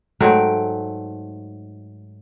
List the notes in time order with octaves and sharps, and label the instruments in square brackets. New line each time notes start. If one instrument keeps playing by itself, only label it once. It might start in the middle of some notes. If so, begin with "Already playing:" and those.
[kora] G#2 F#3 A3 G5